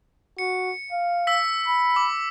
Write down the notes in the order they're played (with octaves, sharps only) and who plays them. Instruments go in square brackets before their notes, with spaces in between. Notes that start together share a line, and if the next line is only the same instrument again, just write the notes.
[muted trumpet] F#4 [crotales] C#7
[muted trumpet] F5
[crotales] E6 B6
[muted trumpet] B5
[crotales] D6